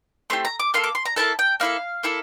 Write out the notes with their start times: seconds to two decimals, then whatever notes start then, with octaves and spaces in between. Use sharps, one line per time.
0.30 A3 C4 E4 G4 C6
0.45 A#5
0.60 D6
0.74 A#3 F4 A4 C6
0.84 D6
0.95 C6
1.05 A#5
1.16 A#3 E4 A4 A5
1.39 G5
1.60 A#3 E4 A4 F5
2.03 A#3 E4 A4